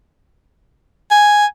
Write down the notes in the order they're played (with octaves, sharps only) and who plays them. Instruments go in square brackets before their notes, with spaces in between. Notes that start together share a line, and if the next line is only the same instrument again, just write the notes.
[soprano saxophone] G#5